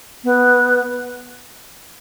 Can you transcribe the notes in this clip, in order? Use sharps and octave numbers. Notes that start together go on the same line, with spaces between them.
B3